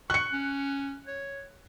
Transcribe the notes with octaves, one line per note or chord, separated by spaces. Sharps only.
C#6 F#6 C#7
C#4
C#5